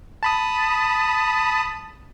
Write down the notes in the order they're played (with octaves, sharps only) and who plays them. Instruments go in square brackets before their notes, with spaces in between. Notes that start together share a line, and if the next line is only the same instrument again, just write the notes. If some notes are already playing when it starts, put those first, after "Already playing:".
[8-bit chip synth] A5 B5 D#6